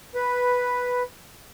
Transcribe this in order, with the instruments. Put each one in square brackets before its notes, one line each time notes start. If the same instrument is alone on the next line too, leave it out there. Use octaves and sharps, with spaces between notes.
[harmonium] B4